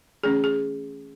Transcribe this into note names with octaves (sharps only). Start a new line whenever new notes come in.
E3 A3 C#4 G#4
G#4